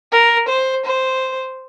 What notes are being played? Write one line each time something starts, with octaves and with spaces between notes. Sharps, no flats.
A#4
C5
C5